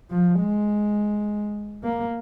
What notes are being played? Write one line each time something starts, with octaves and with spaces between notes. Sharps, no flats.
F3
G#3
A#3